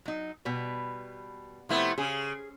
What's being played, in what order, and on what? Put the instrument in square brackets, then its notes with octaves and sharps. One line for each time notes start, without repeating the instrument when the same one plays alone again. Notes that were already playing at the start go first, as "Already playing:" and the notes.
[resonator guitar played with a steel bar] F#3 D#4
B2 G3 B4
[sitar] C3 A3 B3 [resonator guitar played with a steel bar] F3 E4
[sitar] C#3 [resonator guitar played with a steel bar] G#4